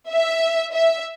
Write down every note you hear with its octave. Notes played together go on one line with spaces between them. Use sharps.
E5
E5